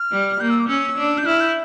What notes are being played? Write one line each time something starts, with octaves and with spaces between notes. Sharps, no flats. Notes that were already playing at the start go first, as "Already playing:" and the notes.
Already playing: F6
G3
A#3 G6
E6
D6
C#4 E6
D4
G6
E4 F6
G6